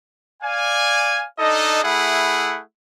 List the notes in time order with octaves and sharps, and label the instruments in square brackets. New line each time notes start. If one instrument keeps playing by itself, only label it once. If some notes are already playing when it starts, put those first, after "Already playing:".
[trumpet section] D5 F5 G#5
D4 D#4 A4 D#5
A3 E4 G#4 F#5 B5